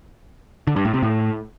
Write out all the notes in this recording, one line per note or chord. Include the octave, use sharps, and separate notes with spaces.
D3
G2
A2
C3
A2